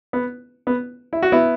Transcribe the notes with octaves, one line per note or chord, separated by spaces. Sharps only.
B3
B3
E4
F#4
B3 E4